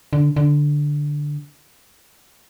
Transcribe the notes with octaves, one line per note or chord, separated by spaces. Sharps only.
D3
D3